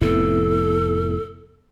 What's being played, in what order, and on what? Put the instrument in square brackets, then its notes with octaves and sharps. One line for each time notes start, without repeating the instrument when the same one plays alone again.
[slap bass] F1 F2 A2 [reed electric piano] B3 E4 [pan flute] A4